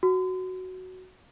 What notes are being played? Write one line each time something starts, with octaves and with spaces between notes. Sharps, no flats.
F#4